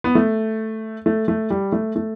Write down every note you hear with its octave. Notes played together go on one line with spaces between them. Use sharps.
B3
A3
A3
A3
G3
A3
A3